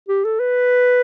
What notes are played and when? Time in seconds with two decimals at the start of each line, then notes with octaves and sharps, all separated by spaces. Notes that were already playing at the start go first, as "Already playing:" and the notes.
0.08 G4
0.24 A4
0.40 B4